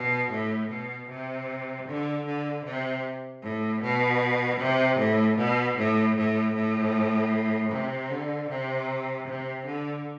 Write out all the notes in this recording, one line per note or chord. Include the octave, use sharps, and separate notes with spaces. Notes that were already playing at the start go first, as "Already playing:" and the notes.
Already playing: B2
A2
B2
C3
D3
D3
C3
A2
B2
C3
A2
B2
A2
A2
A2
C3
D3
C3
C3
D3